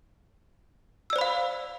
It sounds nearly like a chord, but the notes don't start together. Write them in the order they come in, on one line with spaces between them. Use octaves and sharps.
E6 D5 C5 B5 F5